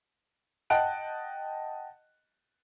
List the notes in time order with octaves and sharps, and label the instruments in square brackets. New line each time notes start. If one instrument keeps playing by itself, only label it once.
[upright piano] D#5 F#5 G5 A5 F#6 D7